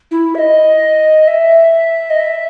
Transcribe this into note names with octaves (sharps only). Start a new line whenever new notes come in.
E4
E5
D#5
E5
D#5
E5